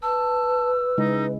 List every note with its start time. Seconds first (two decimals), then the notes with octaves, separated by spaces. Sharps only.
0.03 B4 A5 E6
0.98 C#3 G#3 D#4 E4